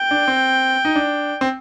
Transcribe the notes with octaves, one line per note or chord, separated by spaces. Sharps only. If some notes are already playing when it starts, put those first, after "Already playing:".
Already playing: G5
D4
C4
D#4
D4
C4